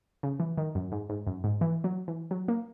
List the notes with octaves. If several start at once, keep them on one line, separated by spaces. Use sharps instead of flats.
C#3
E3
D#3
F#2
G#2
G#2
F#2
G#2
E3
F#3
E3
F#3
A#3